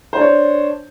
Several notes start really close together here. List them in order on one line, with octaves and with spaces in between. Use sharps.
C5 D4 C#5